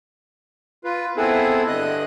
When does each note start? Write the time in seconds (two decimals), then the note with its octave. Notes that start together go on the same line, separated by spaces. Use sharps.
0.85 F4 B4
1.17 B3 C4 E4 G#4 A4 B4
1.67 G2 D3 D#5 D#6 F#6